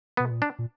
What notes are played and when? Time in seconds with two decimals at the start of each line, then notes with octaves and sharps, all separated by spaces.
0.17 B3
0.20 B2
0.30 A#2
0.42 D4
0.59 A#2